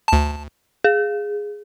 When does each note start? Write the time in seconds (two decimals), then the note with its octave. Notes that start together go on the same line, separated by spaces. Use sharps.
0.08 D2 A5
0.84 G#4